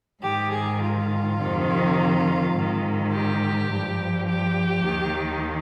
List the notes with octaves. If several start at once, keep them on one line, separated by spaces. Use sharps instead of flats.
G#2 D#3 G4
G#4
F4
F2 C3 D#3
G#2 D#3
G4
G2 F3
G4
D#2 D#3